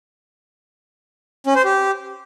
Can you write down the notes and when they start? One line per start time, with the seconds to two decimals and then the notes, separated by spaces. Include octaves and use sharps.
1.47 C#4
1.56 C5
1.64 G4